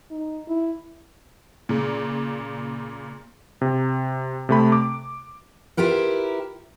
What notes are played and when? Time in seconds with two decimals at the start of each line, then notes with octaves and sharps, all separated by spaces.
0.11 D#4
0.48 E4
1.69 A#2 C#3
3.61 C3
4.49 C3 A3 B5
4.72 D6
5.77 E4 F4 G4 A#4 B4